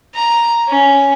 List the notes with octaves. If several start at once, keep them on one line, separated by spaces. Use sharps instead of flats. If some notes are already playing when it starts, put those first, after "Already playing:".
A#5
C#4